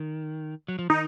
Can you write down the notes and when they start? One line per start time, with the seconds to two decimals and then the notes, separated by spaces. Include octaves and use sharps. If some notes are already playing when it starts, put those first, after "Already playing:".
Already playing: D#3
0.68 F#3
0.79 F3
0.90 D#3 D#4